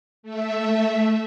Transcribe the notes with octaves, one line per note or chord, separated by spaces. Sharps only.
A3 E5